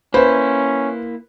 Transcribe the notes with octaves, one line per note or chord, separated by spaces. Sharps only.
A#3 C#4 E4 B4 C5